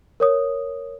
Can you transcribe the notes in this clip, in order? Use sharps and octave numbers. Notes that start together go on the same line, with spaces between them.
A#4 C#5 D#6